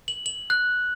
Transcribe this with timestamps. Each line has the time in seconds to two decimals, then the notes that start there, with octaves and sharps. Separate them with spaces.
0.08 F#7
0.26 F#7
0.50 F#6